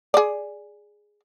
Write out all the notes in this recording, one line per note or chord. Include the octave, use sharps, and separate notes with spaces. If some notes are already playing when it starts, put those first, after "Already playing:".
G#4 D5